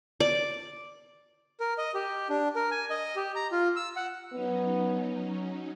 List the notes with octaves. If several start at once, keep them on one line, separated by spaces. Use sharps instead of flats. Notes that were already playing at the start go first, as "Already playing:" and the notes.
D5
A#4
D#5
G4
D4
A#4
G#5
D#5
G4
A#5
F4
E6
F#5
F#3 B3 C#4 D#4